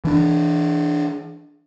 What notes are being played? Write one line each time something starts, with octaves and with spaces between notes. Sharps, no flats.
E3 D4